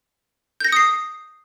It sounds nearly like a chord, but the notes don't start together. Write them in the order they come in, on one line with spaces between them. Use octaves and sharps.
G6 A#6 C#7 D#6 C7